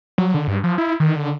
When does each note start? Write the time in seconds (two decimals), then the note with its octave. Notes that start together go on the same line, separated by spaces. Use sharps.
0.18 F#3
0.34 D3
0.47 G2
0.64 F3
0.78 E4
1.00 D#3
1.16 D3